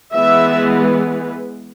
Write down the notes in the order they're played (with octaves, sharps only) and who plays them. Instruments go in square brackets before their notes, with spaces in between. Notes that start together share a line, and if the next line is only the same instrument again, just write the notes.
[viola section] E3 G#3 B3 E5